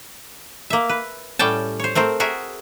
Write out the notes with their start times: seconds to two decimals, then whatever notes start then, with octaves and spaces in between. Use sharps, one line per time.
0.70 A#3 E5
0.89 B4
1.39 A2 G3 C#4 G5 A5
1.80 C5 C#5
1.95 A3 C4 A#4 C5
2.20 F#4 G#4 A#4 E5